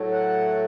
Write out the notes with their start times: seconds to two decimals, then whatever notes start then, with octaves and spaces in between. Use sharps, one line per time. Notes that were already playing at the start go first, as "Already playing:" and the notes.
Already playing: A2 F#3 A3
0.12 F#5